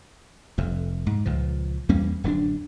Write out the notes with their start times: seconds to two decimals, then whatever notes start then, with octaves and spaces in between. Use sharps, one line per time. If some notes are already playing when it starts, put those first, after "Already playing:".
0.58 F1 F2
1.06 G#2
1.25 C#2 A#2 F3
1.89 E2 G3 A#3 C#4
2.24 D1 F#2 F#3 D4